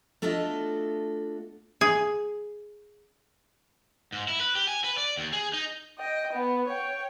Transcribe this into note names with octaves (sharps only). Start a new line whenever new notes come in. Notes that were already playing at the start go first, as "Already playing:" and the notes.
A3 D4 F4 F#4 A4 D#5
G#4
G#2
E4
B4
G4
G#5
B4
D5
D#2
G#4
D#4
D#5 G5
B3
C#5 G5